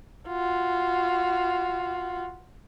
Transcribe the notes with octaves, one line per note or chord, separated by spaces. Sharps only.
F4 F#4